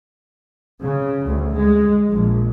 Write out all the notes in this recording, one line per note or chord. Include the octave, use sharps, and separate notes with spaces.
C#3
D2
G#3
A#1